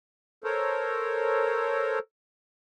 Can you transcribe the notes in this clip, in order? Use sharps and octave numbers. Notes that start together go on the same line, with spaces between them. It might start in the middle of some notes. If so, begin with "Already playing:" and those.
A4 A#4 C5 C#5